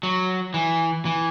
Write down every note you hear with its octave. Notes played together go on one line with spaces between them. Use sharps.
F#3
E3
E3